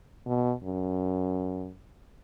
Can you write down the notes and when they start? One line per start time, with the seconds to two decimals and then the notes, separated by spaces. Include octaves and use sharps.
0.26 B2
0.64 F#2